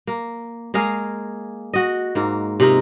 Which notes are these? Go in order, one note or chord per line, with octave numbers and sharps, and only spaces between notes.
A#3
G#3 A#3 G#4 F5
F#4 D#5
G#2 A#3
C3 D#4 F4 A#4